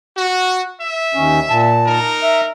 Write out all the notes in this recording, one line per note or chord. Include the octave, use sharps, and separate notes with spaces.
F#4
E5
D#2 C#4
A#2 A5
D#4 A#4
E5